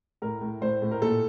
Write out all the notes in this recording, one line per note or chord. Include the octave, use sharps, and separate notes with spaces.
A2 A#4
A2
A2 C5
A2
A#4
A#2 A4